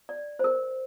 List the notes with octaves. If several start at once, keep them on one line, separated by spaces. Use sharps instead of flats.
D5
C5
A#4